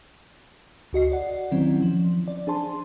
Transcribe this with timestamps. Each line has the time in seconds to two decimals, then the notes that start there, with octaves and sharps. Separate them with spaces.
0.93 D2 F#4 D#5 C7
1.12 D5 F#5
1.52 D#3 F#3 C4 C#4 E4
1.82 F3
2.28 D5
2.47 D4 G#4 C5 A5 C6